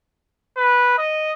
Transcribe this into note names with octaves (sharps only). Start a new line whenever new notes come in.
B4
D#5